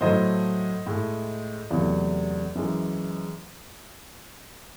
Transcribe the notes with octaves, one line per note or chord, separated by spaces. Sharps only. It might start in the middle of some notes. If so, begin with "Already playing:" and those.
A2 F#3 A3 C5 D#5
A2 G#3
E2 C3 F#3 A3
F#2 E3 G#3